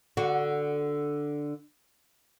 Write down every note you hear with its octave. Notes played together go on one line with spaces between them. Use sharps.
D3 F#4